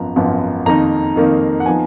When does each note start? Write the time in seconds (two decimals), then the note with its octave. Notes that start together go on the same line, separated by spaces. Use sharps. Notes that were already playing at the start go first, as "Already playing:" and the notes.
Already playing: G#1 F#2 F3 B3 A#5
0.16 G#1 F#2 F3 B3
0.66 F2 D#3 A#3 D#4 A#5
1.16 F2 D#3 A#3 D#4
1.60 F#5
1.66 F3 B3 D#4 G#5